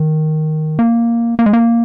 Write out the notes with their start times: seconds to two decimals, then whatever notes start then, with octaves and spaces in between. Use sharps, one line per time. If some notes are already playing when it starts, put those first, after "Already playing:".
Already playing: D#3
0.79 A#3
1.39 A#3
1.46 G#3
1.53 A#3